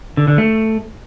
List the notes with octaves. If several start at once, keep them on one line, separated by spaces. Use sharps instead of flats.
D3
D3
A3